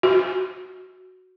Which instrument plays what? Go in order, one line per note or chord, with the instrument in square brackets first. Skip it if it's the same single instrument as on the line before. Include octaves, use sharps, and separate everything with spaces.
[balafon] F#4